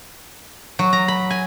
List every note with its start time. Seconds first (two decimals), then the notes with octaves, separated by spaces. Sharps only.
0.79 F#3
0.93 A#5
1.08 B5
1.30 G#5